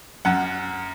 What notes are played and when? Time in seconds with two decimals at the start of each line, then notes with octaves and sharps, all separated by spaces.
0.25 F#2 F#5